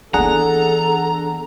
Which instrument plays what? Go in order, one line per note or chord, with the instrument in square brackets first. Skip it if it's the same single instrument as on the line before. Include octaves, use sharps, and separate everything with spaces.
[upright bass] E3 B3 [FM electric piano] D4 G#4 F#5 [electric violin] A4 [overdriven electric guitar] A#5